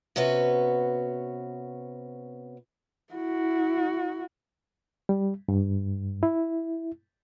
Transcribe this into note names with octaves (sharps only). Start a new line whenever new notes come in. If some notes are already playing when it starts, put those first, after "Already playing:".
C3 B3 C#4 F#4 B4
E4 F#4
G3
G2
E4